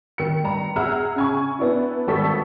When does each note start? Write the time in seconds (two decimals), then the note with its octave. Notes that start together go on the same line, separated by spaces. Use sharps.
0.18 D#3 C#7
0.44 G2 A#5
0.76 G#4 E5 F#5 A#5 E6 F6
1.16 C#3 G#5 C#6
1.59 B3 D4 E4
2.08 G#1 G3 A4 C#6 E6 B6